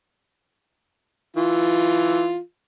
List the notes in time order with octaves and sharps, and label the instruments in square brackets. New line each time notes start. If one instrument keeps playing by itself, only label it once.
[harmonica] E3 F4